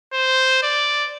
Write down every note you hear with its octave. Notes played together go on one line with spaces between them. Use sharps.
C5
D5